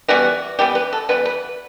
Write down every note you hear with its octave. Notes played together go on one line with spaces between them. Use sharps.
E3 G3 B3 F#4
E3 G3 B3 G4
B4
A4
E3 G3 B3 B4
B4